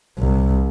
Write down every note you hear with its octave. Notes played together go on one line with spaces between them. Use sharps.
C2